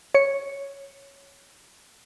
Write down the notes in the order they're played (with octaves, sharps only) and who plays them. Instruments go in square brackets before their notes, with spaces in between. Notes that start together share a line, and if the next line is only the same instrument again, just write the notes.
[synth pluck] C#5 C#7